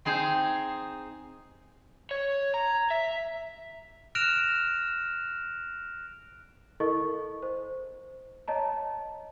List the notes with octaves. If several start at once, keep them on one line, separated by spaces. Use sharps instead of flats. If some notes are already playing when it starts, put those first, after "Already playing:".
C4 D#4 G#4 C5
C#5
A#5
E5
F6 F#6 A#6 D7 E7 F7
E4 A4 A#4 D#5 C#6
C5
C#5 D#5 A5 A#5